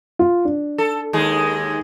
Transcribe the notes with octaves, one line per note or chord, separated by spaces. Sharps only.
F4
D4
A4
D#2 G#3 G#4